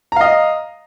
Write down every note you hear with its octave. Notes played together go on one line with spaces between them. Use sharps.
D#5 F5 A#5